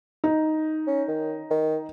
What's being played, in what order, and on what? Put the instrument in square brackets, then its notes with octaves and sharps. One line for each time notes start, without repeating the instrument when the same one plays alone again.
[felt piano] D#4
[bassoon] C#4
D#3
D#3